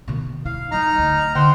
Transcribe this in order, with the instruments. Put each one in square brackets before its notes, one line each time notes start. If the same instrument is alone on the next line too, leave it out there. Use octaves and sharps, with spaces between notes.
[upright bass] B2 D#3
[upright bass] E4 [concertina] F5
[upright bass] F#3 [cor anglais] D#4 [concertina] A#5 F6
[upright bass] D2
[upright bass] D3 [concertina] C5 F#5 G5